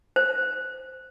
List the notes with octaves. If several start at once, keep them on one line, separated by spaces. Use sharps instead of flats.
C5